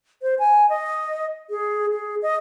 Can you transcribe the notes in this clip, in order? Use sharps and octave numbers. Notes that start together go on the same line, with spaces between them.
C5
G#5
D#5
G#4
G#4
D#5